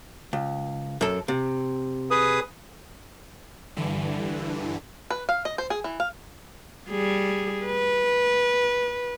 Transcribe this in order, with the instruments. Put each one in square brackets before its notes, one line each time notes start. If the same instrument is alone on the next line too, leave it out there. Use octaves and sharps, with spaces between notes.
[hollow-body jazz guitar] C#2
F#2 A4
C3
[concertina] G#4 B4 D#6
[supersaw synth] G2 D3 E3
[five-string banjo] B4
F5
D#5
C5
G#4
E3
F5
[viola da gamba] G3 G#4
B4